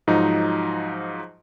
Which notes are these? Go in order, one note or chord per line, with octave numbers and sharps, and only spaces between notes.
G#2 F3 F#3 D#4